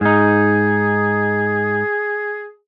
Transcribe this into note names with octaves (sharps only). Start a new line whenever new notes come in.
G#2 D#4 G#4